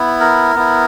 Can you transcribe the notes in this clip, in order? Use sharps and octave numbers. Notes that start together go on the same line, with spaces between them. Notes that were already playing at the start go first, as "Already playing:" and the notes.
Already playing: B3 E4
A#4
B3 E4